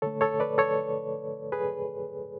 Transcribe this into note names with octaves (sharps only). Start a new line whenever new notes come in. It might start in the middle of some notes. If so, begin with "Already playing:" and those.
D3 A3 A4 C#5
A4 C#5
B4 D5
A4 C#5
G#4 B4